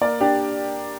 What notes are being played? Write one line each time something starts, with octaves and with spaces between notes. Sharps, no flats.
A#3 A#4 D5
D4 G4